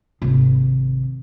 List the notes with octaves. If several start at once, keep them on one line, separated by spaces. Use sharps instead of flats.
G#1 C3